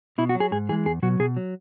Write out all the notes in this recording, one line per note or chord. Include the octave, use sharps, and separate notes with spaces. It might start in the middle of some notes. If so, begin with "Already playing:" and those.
B2 E4
F#4
F#3
G#4
G#2 G#4
E3 G#3 G#4
E2 G#4
B2 F#3 F#4
B2 G#4
F#3